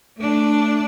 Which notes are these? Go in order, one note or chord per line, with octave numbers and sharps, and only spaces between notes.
A3 D4